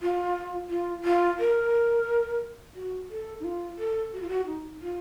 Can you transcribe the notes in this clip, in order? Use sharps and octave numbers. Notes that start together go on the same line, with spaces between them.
F4
F4
F4
A#4
F#4
A4
D#4
F4
A4
F#4
F4
F#4
D#4
F4